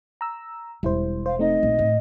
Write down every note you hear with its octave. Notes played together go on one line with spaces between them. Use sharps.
A#5 E6
E1 G3 E4 C5
C5 F5
A3 C4 D#4 D#5
A#1
A2